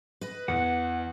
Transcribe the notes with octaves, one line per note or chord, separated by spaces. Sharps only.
B4 D#5
E2 F#5